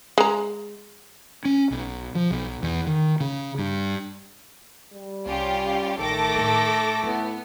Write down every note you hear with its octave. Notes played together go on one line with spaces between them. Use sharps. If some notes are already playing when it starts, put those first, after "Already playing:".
G#3 A#5
C#4
B1
F3
B1
E2
D#3
C#3
G2
G3
C2 C#4 F4 G4
A1 D#3 A3 A4 D6 A#6
A2 D#4
A2 B3 D4 E4